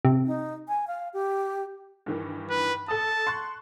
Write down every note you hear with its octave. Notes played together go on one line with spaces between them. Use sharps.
C3
D#4
G#5
F5
G4
G2 D#3 E3
B4
A4 A5 D#6
C6 C#6 F#6